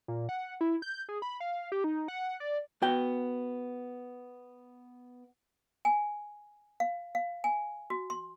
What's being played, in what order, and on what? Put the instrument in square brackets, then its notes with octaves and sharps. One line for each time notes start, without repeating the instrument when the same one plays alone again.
[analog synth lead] A#2
F#5
E4
G6
G#4
B5
F5
G4
D#4
F#5
D5
[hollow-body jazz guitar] B3 F#4 G5
[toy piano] G#5
F5
F5
G#5
F#4
C6